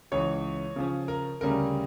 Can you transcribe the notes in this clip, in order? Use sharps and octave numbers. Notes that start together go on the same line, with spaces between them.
C#2 C#3 E3 C#5
C#3 F3 C#4
A#4
D2 C#3 G3 C#4 A#4